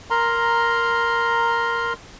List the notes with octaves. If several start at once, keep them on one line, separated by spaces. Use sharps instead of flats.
A#4 A#5 C6